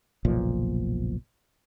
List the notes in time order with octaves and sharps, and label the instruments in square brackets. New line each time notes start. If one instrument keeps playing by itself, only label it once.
[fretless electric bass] F#1 B1 A#2 F3